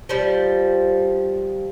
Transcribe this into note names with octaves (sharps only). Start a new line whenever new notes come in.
F3 G3